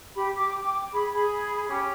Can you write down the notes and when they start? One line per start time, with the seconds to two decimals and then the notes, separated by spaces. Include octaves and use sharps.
0.15 G4 B5
0.34 G4 D6
0.61 G5 D6
0.92 G#4 B5
1.14 G#4 B5
1.68 C#4 G4